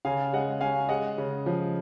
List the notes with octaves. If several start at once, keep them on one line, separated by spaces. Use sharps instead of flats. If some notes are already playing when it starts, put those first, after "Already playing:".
C#3 F5 G#5
G#3 D#5 F#5
C#4 F5 G#5
G#3 D#5 F#5
C#3
F3